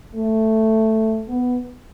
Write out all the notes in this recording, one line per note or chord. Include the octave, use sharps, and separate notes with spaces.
A3
B3